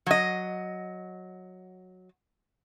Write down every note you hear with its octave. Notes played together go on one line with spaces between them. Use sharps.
F#3 D#5